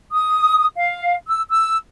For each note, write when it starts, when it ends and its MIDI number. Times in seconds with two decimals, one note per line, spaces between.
0.11 0.66 87
0.76 1.15 77
1.27 1.42 88
1.50 1.77 88